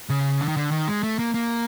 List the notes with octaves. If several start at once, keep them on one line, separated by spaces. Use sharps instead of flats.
C#3
D3
D#3
D3
D#3
G#3
A3
A#3
A#3